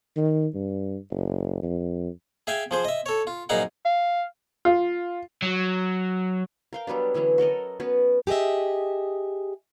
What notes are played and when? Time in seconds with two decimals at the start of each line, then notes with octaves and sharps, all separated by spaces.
0.17 D#3
0.54 G2
1.11 F#1
1.63 F2
2.47 G#4 E5 F5 G5 G#5
2.71 F3 G#4 C5
2.85 D#5 E5
3.06 A4 C#5
3.27 F4
3.49 A#1 F#2 D#4 G#4 F5 F#5
3.85 F5
4.65 F4
5.42 F#3
6.73 A#4 F5 G5
6.87 F#3 G3 B3 D4
7.14 D3 E3 F#3 C#4
7.38 F#4 A4 A#4 D#5
7.80 B3 C#4 F#4 B4
8.27 G4 G#4 B4 D#5 E5